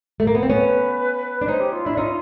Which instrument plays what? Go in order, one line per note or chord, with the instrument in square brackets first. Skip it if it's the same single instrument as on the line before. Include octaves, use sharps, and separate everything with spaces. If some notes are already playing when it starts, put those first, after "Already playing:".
[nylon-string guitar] A3
A#3
B3
C4
[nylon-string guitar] B3 C#4 [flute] B4
[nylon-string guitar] D4
[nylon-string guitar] C#4 D#4 [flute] C5
[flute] G4
F4
[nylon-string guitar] D4 [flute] E4
[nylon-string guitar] C#4 D#4 [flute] F4